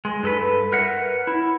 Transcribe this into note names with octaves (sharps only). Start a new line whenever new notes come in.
G#3
G2 A4 B4
A#4 B4 C#5 E5 F#5
E4